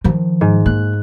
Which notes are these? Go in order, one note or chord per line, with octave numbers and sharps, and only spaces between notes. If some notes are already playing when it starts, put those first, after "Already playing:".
D#3 F3
G#2
A#3 F#6